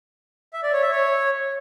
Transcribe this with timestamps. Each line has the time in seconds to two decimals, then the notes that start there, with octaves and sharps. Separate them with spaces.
0.53 E5
0.63 D5
0.73 C#5
0.82 E5
0.92 C#5